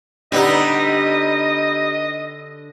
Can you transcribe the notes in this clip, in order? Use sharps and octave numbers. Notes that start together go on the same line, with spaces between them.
D3 G3 B3 D#4 D#5